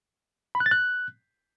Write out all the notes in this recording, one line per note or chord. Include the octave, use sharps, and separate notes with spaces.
B5
F#6
A6
F#6